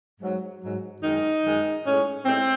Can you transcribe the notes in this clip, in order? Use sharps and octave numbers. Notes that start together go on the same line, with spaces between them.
G#2 F#3
G#2 F#3
F#2 D#3 G#3 D#4
F#2 D#3 G#3
A2 G#3 C#4
A2 G#3 C4